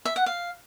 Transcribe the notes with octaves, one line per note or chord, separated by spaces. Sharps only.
E5
F#5
F5